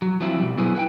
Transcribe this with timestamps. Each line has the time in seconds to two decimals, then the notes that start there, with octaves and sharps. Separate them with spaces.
0.02 F#3
0.20 F3 F#3 C4 E4 F4
0.38 B2 G3
0.57 F#3 B3 E4 G#4 B4 C5
0.75 E4 B4 F#5 G5